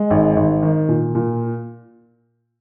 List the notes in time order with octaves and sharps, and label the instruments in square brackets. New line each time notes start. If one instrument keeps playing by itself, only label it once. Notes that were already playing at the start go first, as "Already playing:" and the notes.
Already playing: [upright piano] G#3
G#1
G#1
D#3
A#2
A#2